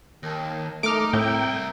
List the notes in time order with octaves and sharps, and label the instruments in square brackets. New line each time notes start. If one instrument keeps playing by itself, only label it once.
[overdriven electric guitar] D#2 [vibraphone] A#4 A5
[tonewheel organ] A3 [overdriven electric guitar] D#4 [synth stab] D6 F6
[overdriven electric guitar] C2 E5 [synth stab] A2 [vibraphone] C4 A#4 A#5 [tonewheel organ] G5